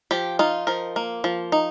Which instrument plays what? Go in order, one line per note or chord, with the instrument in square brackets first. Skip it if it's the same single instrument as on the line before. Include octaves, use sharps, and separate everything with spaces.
[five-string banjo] F3 G4
D#4 F4
F3 A#4
A#3
F3
D#4